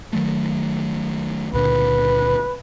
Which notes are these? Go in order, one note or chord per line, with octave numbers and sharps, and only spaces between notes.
D#3 F#3 A3
C#2 A#2 D3 B4